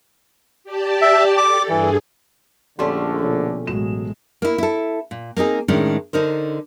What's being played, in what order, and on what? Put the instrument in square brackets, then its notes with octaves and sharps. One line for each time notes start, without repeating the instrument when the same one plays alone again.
[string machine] G4 D5 A5
[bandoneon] E5
[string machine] A4 [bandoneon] D6
[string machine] G2 G#4 [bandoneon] E3
[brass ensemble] A#1 D3 [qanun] A3 C#4 G4 [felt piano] D5 C6
[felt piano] B2 F3 C#5
[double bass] A1 G#3 [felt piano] B2 F#3 E7
[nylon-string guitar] A#3 E4
E4 A4
A#2
A#3 C4 D#4 G#4
A2 D#3 G#3 C#4 D4
D3 D#4 A#4 C5